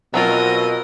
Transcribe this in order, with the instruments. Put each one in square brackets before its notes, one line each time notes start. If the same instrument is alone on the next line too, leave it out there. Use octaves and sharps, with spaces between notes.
[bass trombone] B2 [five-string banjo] F#3 C4 F4 [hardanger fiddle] A#4 D#5